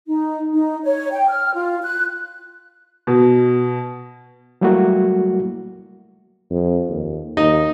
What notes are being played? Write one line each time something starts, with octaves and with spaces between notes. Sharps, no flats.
D#4
D#4
C#5
G5
F6
F4
F#6
B2
F#3 G3 A3 A#3 E4 F#4
F2
D#2
D#2 D#4